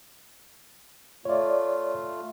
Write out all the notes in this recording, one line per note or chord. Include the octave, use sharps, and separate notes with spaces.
A3 F4 C#5 D5